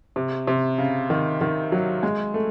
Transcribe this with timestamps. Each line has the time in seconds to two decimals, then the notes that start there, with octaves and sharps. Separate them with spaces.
0.16 C3
0.47 C3
0.78 C#3
1.10 D#3
1.41 D#3
1.72 F#3
2.03 G#3
2.34 A3